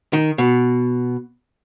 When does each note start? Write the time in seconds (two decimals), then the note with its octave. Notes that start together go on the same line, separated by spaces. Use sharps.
0.13 D#3
0.38 B2